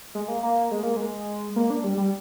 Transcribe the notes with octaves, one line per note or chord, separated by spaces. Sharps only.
G#3
A#3
A#3
G#3
A#3
G#3
A#3
D4
G3
G3